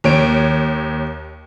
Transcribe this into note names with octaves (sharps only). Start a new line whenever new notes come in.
D#2 C#5 D7